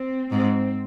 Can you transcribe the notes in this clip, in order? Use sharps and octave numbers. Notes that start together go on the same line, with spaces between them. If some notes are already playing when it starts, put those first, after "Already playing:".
Already playing: C4
G#2 C4